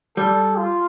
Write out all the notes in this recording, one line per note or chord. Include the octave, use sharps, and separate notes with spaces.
G3 A4
F4